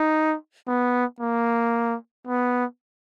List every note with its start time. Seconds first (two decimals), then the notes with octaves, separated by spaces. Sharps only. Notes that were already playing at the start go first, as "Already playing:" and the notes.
Already playing: D#4
0.67 B3
1.21 A#3
2.27 B3